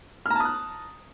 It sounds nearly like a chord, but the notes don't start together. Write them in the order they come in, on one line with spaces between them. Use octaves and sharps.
F6 A#5 A5 D#6 F#6